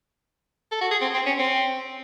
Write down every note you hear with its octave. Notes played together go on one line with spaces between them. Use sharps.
A4
F#4
G#4
C4
C4
C#4
C4